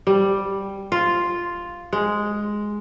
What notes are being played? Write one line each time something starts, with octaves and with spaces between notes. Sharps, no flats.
G3
F4
G#3